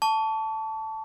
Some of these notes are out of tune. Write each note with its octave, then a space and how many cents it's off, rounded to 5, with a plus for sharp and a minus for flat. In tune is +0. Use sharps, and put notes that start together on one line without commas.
A5 +0 C#6 +40